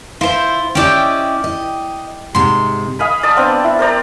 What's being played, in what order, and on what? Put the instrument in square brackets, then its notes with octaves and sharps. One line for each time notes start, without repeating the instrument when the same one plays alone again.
[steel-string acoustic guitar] E4 [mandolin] F4 C5
[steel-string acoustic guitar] C#4 E4 D#5 [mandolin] G4 D5 G5
[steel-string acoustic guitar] D#5
[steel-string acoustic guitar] G#2 C3 [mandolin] C6
[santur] D#5 F5 G#5 B5
D5 A5 D#6
B3 C4 D4
E4
A#4 C5 D5 A#5